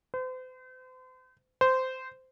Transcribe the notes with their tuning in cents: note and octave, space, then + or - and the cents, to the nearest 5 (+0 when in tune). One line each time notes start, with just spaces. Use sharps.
C5 -40
C5 -15